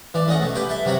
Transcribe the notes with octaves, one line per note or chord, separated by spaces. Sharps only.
E3 D5
A3 C#4 D#5 F#5
B2 A3
G4 B4 G5 G#5
A4 E5
C3 F#3 F#4 C#5 F#5